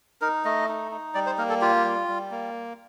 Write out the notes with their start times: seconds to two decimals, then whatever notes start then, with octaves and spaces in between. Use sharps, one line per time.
0.21 D#4 A#4
0.45 A3 D#5
0.68 D#4
0.91 D#4
1.15 G3 D5
1.26 C5
1.38 A#3 A#4
1.49 A4
1.61 F4 G4
1.84 G3
2.08 G3
2.31 A#3